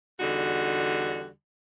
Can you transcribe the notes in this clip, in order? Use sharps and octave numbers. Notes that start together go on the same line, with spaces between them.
E2 D3 G3 D#4 F#4